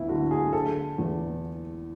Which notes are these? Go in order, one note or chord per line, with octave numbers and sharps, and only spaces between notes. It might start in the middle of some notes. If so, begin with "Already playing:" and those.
Already playing: D2 B3 E4
D3 F#4
G#4
D3 A4
E2